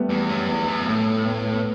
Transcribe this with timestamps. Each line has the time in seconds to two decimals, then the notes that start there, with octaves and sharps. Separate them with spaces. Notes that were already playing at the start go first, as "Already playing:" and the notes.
Already playing: G3 A3 B3
0.09 E2
0.29 F#2
0.49 E2
0.68 F#2
0.80 B2
0.87 A2 A3
1.25 B3
1.38 B3
1.52 B3